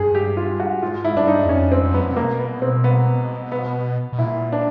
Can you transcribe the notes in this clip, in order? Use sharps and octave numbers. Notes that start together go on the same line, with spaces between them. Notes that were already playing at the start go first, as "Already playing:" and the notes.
Already playing: G2 G#4
G4
F4
F#4
G#2 F4
E4
G2 D4
D#4
E2
F2 C#4
C4
F2
F#2 B3
F2
C3
B2 A#3
B3
C4
B3
B3
B2
A#2 E4
D4